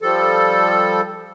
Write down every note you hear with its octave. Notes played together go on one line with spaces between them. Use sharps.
F3 G3 A4